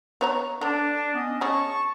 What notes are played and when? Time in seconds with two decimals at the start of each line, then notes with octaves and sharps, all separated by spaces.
0.21 B3 C#5 A#5
0.61 D3 D4
1.15 B3 C#4 D#5
1.41 C#4 G#4 A5 C#6